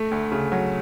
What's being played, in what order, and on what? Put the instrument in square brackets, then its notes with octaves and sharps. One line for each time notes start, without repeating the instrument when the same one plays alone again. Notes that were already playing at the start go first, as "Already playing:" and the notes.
Already playing: [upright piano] A3
D2
C#3
F#3